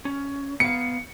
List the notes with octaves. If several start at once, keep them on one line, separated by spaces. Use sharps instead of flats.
C#4
B3 F5 C#7